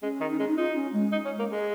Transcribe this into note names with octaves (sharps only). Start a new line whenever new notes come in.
G#3 C#4
D#3
D#4
G#3 C#4
D#4
D#4 F4
C#4
G#3
D#4
C#4
A#3
G#3 G#4